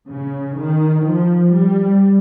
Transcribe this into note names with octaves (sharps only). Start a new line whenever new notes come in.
C#3
D#3
F3
G3